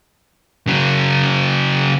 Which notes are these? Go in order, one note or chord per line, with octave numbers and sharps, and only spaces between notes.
C#3 F#3